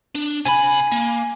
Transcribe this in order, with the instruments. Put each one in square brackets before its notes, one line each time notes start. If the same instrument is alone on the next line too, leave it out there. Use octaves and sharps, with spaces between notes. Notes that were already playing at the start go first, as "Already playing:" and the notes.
[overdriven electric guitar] D4
[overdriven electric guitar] C3 B5 [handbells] G#5
[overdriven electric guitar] A#3